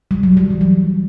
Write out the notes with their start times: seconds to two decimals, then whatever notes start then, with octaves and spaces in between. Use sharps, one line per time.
0.11 G3
0.23 F#3
0.37 G3
0.51 E3
0.61 F#3